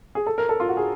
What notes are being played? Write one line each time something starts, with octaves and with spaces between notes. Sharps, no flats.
G#4
A4
A#4
A4
F4
F#4
G#4